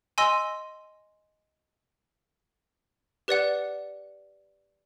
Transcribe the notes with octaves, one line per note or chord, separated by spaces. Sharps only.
D#5 G#5 C6 E6
G4 B4 D5 F#5